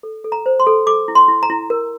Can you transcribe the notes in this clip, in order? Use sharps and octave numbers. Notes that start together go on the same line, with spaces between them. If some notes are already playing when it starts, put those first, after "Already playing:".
A4
A4
A#5
C5
C6
A4
A4 D6
E4
C6
E4
A#5
E4
A#4